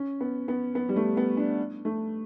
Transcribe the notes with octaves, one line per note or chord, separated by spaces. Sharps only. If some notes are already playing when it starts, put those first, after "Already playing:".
Already playing: C#4
B3
B3
B3
G3
A3
B3
D4
A3